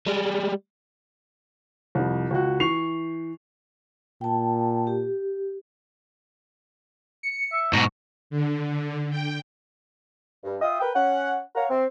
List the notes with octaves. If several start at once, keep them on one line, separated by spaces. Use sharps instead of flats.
G3 G#3
C2 F2
C#2 F#4
E3 C#6 C7 F7
A#2 G5 A5
G4
C#7
E5
G#2 B2 A#5 C#6
D3
G5
G2
F4 E5 G5 D#6
A#4 B4 G5
C#4 F#5
C#5 F5 F#5 A#5
C4